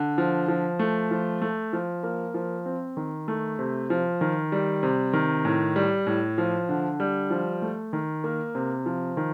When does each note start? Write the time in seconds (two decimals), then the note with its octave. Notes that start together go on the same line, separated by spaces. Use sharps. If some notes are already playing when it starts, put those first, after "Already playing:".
Already playing: D3
0.18 F3
0.48 F3
0.79 A3
1.11 F3
1.42 A3
1.73 F3
2.03 A#3
2.34 F3
2.66 C4
2.97 D#3
3.28 A3
3.59 C3
3.90 F3
4.21 D#3
4.52 G3
4.83 C3
5.13 D#3
5.45 A2
5.76 G3
6.07 A2
6.38 F3
6.69 D3
7.00 G3
7.30 F3
7.62 A3
7.93 D#3
8.24 A#3
8.55 C3
8.86 F3
9.17 D#3